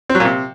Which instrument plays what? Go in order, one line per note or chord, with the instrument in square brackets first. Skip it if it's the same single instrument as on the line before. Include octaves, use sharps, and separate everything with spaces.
[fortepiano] C4
F#3
A#2
C3